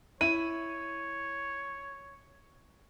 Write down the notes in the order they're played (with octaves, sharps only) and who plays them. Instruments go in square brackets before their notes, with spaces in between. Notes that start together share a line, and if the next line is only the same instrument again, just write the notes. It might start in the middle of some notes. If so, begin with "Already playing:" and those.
[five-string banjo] E4 [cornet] C#5 [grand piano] D#7